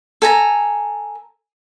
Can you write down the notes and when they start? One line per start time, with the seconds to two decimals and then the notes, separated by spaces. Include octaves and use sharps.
0.22 A4 G#5 A#5